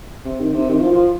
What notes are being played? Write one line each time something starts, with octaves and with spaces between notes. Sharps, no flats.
C3
D#3
C3
D#3
F3
F3